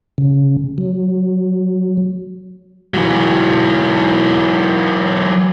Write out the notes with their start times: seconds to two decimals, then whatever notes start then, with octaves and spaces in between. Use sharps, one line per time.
0.18 C#3
0.78 F#3
2.94 E3 F#3